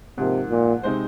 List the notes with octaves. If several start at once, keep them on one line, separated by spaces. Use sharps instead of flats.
G#2 C3 F3 A#3
A#2
C3 G#3 D#4 C5